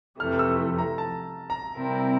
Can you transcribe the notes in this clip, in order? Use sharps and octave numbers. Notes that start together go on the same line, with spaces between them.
F2 C3 E3 A3 F6
E6
A#5
A5
A#5
C3 G3 C4 E4 A#4